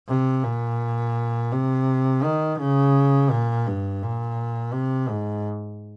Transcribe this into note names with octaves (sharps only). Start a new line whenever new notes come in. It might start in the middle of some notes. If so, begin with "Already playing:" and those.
C3
A#2
C3
D#3
C#3
A#2
G2
A#2
C3
G#2